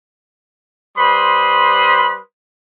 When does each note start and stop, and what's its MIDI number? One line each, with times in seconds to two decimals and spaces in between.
0.98 2.20 55
0.98 2.20 71
0.98 2.20 72
0.98 2.20 83
0.98 2.20 84
0.98 2.20 87